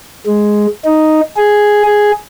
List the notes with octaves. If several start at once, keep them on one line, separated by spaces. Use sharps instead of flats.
G#3
D#4
G#4
G#4